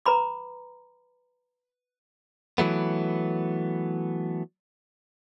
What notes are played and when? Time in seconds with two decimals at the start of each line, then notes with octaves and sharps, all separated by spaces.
0.06 B4 A#5 B5 D6
2.58 E3 F#3 A3 B3